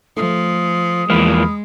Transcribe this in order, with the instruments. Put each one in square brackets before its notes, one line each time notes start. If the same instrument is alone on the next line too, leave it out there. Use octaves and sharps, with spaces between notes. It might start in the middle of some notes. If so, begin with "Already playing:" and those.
[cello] F3 [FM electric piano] A3 [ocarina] D#6
[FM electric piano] E2 B5 F6 [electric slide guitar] E3 F3 A#3 [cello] G#3